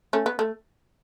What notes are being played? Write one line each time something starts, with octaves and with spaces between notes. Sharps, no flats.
A3 C#4
B3
A3